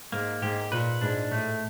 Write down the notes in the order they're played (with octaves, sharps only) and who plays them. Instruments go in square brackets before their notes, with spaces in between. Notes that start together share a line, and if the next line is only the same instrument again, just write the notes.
[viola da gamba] G#2 [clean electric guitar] A#3
[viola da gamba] G#2 [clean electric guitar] G4
[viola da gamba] A#2 [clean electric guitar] B4
[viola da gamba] G#2 [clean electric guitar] D4
[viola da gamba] A2 [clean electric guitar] A3